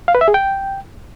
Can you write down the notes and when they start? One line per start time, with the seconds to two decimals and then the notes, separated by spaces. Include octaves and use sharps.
0.08 F5
0.15 B4
0.21 E5
0.28 G#4
0.34 G5